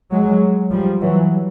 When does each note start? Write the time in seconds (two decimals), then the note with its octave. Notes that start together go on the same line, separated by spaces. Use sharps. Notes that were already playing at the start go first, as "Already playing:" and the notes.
0.12 F#3 G#3
0.71 F3 G3
1.01 E3 F#3